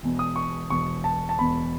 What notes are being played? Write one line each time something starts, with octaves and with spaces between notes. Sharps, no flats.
E1 E2 B2
D#6
C#6
E1 E2 B2 C#6
A5
A5
E1 E2 B2 B5